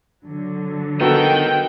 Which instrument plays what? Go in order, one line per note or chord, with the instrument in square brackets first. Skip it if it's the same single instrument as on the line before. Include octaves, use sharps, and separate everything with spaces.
[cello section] D3 F#3
[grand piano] B3 F#4 A4 [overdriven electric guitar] D#4 A#4 [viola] G5